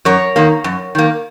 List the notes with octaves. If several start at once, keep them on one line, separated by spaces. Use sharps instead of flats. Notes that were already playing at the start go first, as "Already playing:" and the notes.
F#2 A#4 C#5
D#3 A#3
F#2
D#3 A#3